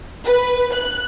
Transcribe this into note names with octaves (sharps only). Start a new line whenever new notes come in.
B4
F#6